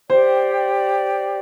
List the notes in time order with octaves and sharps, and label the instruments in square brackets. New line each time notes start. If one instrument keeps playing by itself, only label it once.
[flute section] G4 D5 G5 [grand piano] C5